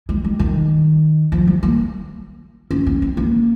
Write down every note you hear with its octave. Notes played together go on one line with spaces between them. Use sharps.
G#3
G3
D#3
F3
G3
A#3
C#4
C#4
C4
A#3